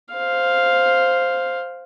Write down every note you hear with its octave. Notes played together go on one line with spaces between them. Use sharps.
C5 F5